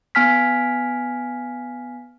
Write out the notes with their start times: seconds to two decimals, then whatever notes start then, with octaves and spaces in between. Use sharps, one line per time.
0.15 B3 G#5 F6 B6